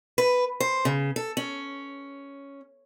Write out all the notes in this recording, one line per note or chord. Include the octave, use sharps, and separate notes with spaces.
B4
C5
C#3
A4
C#4